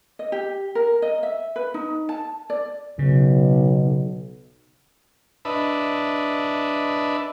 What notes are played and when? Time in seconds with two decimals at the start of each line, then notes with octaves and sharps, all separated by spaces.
0.19 D#5
0.32 G4
0.75 A#4
1.02 D#5
1.23 E5
1.56 B4
1.74 D#4
2.09 A5
2.50 D5
2.99 B1 C#3
5.45 D4 B4 D#5 E5 A5 B5